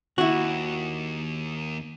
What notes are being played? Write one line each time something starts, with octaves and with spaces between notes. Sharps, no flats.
D#2 E4 F#4